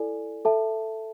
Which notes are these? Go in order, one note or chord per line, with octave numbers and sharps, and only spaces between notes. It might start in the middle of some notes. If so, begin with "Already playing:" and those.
Already playing: E4 A4 D5 G#5
A4 E5 A5